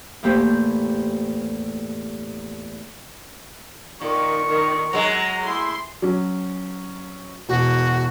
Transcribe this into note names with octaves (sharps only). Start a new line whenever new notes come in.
E2 A2 A#3 G4 C5 G5
A#2 D#3 C#6
D#3
F#3 G#3 A#5
A3 E4 G#4 C6
F#3 C#4
E1 F#4